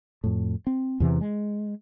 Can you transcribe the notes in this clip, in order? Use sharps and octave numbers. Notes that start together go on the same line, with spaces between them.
F2 A2
C4
E2 C3 E3
G#3